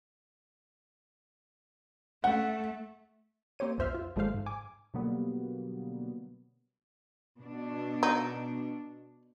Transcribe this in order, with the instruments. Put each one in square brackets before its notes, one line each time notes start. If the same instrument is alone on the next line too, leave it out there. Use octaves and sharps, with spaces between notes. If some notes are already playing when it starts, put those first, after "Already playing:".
[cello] A3 [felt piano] F#5
[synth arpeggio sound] A#3 C4 G4 C#5 D#7
B1 F2 C5 E5 F6
F4
G#1 F3 G#3 A3 C5 F5
G#2
G#5 D6
[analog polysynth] B2 D3 F#3 G3 A#3 B3
[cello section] B2 D4
[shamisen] D#4